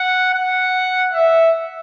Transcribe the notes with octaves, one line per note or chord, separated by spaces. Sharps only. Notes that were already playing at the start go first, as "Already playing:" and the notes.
Already playing: F#5
F#5
E5